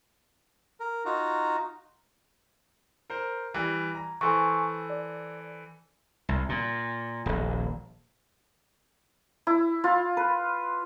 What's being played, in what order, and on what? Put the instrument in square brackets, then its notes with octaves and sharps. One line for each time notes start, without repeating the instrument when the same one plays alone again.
[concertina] A#4
D#4 F4 F#4 A#5
[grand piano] A#4 C5
E3 G3
A#5
[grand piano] E3 A4 C5 [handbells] G#5 C6 C#6
[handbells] D5
[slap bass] C2
A#2
D#1 A#1
[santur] E4
F4
B4